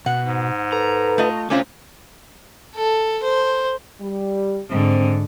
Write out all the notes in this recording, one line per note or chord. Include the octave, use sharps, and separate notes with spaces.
B2 F#5
G#2
A4 B4 A#5
A3 F4 D#5
C3 A3 C#4 F4 C5 G#5 D6
A4
C5
G3
G#2 D3 C4